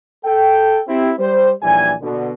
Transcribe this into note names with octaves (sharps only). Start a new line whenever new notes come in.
A4 G5
C4 E4 G4
G3 C5
A#1 D#2 E3 G3 D5 G#5
B2 D3